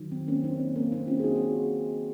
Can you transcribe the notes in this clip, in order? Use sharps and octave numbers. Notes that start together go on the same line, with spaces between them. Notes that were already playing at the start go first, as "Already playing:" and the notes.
Already playing: D#3 F#3
C4
A#3 C#4
C4 D#4
C4
A#3 C#4
C4 D#4
C#4 F4
G#4
D#4 F#4
F#4